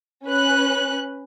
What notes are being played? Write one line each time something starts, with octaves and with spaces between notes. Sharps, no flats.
C#4 B4 F#6